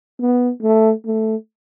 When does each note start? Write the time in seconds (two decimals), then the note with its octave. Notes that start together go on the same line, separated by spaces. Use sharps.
0.21 B3
0.62 A3
1.06 A3